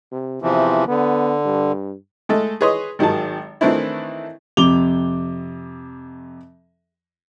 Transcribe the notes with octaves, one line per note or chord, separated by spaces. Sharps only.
C3
E2 C3 E3 F3
D3 B3
G2
G#3 A3 A4
G#4 B4 C#5 D#5 C6 D#6
G#1 D#3 F#3 G#4 A5
D#3 E3 A3 C4 D4 E4
F2 C3 D6 F7 G7